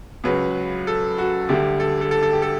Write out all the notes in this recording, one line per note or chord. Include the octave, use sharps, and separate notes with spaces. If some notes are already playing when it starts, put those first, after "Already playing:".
C#2 C#3 F#3 B4
A4
F#4
D2 D3 G3 G4
A4
A4
A4
A4
G4
A4